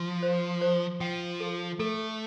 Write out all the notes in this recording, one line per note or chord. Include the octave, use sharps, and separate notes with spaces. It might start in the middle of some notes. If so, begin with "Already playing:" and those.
Already playing: F3 C6
C5
C5
F3 G5
A4
A3 A4